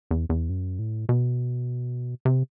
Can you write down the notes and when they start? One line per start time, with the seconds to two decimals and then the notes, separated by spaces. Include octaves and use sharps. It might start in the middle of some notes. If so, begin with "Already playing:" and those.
0.11 E2
0.29 E2
0.50 F#2
0.79 A2
1.09 B2
2.25 C3